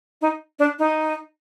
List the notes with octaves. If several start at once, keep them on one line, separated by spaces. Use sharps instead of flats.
D#4
D4
D#4